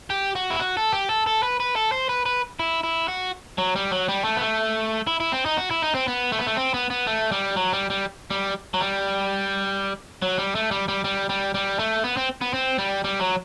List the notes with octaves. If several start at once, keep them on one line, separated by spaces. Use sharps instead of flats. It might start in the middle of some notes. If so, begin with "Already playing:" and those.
G4
F#4
E4
F#4
A4
G4
A4
A4
B4
B4
A4
C5
B4
B4
E4
E4
F#4
F#3
G3
F#3
G3
A3
B3
A3
E4
E4
C4
D#4
F#4
E4
D#4
C4
B3
A3
B3
A3
C4
B3
B3
A3
G3
F#3
G3
G3
G3
F#3
G3
F#3
G3
A3
G3
G3
G3
G3
G3
A3
B3
C4
B3
C4
G3
G3
F#3